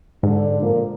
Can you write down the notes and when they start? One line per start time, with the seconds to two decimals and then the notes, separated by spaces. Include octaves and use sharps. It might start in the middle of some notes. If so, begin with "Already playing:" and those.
0.23 G#2 D3
0.61 A#2 F3 A#3